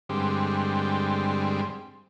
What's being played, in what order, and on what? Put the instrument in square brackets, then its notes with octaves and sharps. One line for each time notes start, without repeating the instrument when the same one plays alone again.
[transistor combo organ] G2 D3 G3 G#3 C4